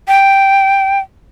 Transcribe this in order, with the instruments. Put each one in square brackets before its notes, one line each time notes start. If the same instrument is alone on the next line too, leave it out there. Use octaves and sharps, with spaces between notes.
[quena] G5